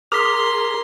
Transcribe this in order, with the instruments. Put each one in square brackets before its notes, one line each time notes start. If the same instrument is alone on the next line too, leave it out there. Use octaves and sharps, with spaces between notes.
[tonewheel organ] G#4 A#4 A#5 [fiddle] C6 [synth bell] D6 B6